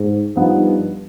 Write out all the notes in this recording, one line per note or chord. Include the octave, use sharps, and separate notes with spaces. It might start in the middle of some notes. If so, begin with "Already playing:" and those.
Already playing: G#2
G2 F3 B3 D#4